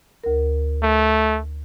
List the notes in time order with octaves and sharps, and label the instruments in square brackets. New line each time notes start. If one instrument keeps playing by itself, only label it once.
[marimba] D2 A#4
[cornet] A3